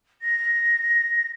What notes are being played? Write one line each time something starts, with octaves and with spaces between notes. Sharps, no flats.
A#6